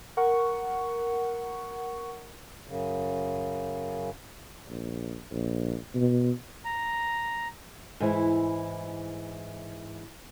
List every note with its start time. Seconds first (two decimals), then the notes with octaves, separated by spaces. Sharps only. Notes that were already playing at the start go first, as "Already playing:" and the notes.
0.17 A#4 F#5 C#6
2.68 F#2 C#3
4.69 A#1
5.32 A#1
5.95 B2
6.65 A#5
8.00 G#2 E3 E4